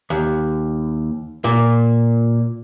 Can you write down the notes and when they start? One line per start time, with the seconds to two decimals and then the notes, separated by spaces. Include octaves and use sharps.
0.10 D#2
1.44 A#2